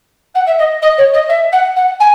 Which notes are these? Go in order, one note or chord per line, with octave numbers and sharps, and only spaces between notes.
F#5
E5
D#5
D#5
C#5
D#5
E5
F#5
F#5
G#5